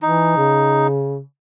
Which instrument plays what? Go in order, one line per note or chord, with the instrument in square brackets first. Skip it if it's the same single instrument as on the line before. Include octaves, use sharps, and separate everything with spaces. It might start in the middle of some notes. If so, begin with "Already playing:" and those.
[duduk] E3 [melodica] D#4
[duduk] C#3